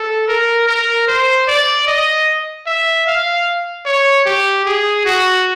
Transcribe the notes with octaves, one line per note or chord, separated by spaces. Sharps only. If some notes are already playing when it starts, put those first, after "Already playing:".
Already playing: A4
A#4
A#4
C5
D5
D#5
E5
F5
C#5
G4
G#4
F#4